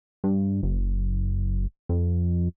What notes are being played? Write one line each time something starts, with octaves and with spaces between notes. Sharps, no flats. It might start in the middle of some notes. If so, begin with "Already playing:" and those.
G2
F#1
F2